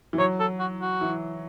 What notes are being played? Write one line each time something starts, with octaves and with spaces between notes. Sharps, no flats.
E3
F#3 C#5
A4
F#4
F#4
E3